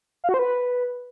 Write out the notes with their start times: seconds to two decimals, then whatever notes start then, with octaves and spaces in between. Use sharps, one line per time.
0.24 F5
0.29 F#4
0.34 C5
0.39 B4